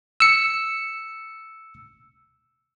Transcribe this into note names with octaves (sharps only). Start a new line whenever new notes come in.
E6 C#7